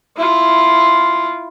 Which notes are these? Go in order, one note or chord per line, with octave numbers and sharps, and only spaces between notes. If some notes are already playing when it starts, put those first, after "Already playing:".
E4 F4